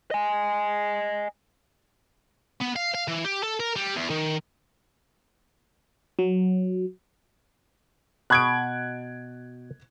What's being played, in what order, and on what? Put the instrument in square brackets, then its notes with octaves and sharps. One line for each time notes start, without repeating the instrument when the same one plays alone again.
[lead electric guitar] D#5 G#5
[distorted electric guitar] B3
F5
F5
E3
G4
A4
A#4
G3
E2
D#3
[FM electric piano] F#3
[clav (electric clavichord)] B2 [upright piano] F#6 G#6 D7